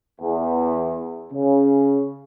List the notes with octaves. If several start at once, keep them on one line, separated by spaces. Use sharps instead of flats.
E2
C#3